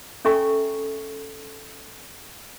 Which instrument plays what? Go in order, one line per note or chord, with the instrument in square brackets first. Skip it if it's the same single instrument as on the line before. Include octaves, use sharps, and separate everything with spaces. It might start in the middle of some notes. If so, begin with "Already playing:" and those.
[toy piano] C#4 A4 E5 G#5 A#5 C#6